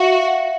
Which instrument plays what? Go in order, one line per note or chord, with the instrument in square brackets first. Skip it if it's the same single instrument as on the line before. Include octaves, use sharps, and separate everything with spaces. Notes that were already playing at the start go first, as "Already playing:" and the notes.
Already playing: [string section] F#4 [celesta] E5 F5